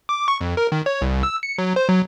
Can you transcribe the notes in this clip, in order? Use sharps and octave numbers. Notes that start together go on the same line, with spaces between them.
D6
C#6
F2
A#4
D#3
C#5
C2
E6
C#7
F#3
C5
F#3